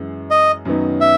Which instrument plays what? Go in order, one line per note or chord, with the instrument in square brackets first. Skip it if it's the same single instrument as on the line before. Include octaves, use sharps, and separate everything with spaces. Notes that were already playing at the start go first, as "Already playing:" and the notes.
Already playing: [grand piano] F#2 E3 G#3
[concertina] D#5
[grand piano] F#2 D#3 F#3 B3 D#4
[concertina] E5